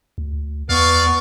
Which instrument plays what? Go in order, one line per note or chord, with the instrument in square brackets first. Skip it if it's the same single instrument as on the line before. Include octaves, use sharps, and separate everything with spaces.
[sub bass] D2
[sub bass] E2 [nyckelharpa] B3 C#6 [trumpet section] D5 F5